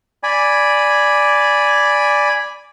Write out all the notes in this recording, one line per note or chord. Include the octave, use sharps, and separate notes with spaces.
D5 G#5 B5